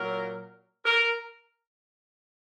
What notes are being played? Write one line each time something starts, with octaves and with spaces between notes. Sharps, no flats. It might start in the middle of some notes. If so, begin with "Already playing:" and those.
Already playing: A#2 F#3 A#4
A#4